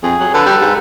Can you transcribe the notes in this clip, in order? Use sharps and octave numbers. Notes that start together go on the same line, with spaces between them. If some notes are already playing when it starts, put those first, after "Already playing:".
F2 G#4
F#3
D3 A4 B4
G3
G#2